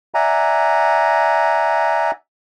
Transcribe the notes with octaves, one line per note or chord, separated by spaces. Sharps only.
D5 E5 F#5 G#5 A#5